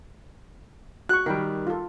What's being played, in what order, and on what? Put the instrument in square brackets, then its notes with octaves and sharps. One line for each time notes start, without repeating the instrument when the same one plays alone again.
[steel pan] F#4 C#6 [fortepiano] F#6
[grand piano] D#3 G3 [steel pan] A#4 G5 B5
[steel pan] F4 A4